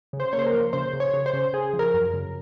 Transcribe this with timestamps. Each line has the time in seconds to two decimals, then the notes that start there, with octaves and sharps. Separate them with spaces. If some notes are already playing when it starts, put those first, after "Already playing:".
0.13 C#3
0.20 C5
0.33 A#3 C#5
0.39 C5
0.46 A#4
0.54 F3
0.73 C#3 C5
0.93 C#3
1.00 C#5
1.13 C#3
1.26 C5
1.33 C#3
1.53 C#3 G#4
1.73 F3
1.79 A#4
1.94 F#2
2.14 C#3